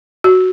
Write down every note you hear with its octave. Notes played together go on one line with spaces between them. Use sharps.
F#4